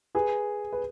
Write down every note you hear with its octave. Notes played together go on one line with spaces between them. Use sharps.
G#4 B4
B4